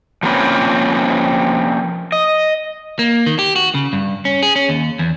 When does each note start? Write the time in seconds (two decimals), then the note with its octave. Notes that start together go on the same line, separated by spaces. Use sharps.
0.23 F3 A#3 C4 C#4 B4
2.12 D#5
2.99 A#3
3.26 D#3
3.39 G4
3.56 F#4
3.75 C#3
3.93 G2
4.25 C#4
4.43 G#4
4.56 C#4
4.69 D#2
4.99 E2